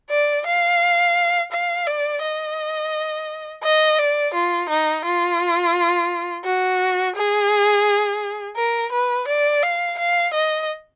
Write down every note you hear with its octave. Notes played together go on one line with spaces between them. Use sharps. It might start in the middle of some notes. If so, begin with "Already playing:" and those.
D5
F5
F5
D5
D#5
D#5
D5
F4
D#4
F4
F#4
G#4
A#4
B4
D5
F5
F5
D#5